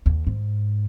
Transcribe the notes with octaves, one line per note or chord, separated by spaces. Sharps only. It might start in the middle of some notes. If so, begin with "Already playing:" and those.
D#2
G#2